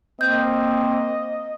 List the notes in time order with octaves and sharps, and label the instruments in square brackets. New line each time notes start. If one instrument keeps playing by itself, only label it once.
[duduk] A#3 [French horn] C4 [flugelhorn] D#5 [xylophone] G6